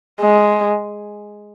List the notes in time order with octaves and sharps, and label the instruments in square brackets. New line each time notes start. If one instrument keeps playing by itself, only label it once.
[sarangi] G#3